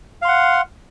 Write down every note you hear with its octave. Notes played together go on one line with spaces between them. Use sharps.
F5 F#5 C6